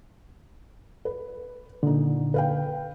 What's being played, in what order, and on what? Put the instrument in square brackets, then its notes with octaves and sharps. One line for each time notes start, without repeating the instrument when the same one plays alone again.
[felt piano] B4
[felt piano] A#2 D#4 [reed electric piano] D3
[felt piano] B4 F5 G5